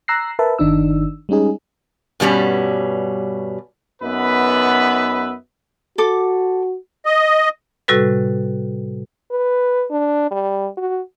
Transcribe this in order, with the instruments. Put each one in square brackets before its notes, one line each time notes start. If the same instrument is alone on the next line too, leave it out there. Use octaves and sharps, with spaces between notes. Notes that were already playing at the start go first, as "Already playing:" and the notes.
[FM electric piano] A#5 E6 F#6 A#6 C7
A#4 B4 E5 A5
G1 D#3 D4 D#4 E6
G3 G#3 C#4 D#4 G#4
[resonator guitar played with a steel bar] G2 B2 G3 C#4
[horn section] F#2 B3 D#4 B4 E5 B5
[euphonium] F#4 [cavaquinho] A4 D6
[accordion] D#5
[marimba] A2 C3 G3 F#4 A4 B4
[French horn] B4
D4
G3
F#4